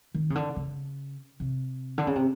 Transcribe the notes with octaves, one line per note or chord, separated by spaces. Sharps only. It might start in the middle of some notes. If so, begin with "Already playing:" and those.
D#3
C#3
D3
C#3
C3
D3
C#3
C3